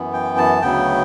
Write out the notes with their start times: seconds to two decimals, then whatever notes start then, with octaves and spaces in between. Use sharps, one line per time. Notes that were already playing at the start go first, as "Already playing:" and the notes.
Already playing: F#2 E3 B3
0.13 G5
0.37 A5
0.62 D2 C#3 F#3 B3 G5